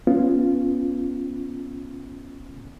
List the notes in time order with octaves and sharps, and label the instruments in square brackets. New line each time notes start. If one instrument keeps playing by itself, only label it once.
[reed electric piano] B3 C#4 F4